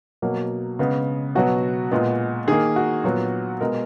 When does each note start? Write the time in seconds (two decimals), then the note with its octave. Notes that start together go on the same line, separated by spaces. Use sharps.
0.22 B2 F#3 A#3
0.79 C#3 G#3 B3
1.35 B2 F#3 B3 F#4
1.92 A#2 G#3 B3
2.48 D#3 A#3 G#4
2.76 F#4
3.04 A#2 F#3 B3
3.61 B2 G#3 B3 A#4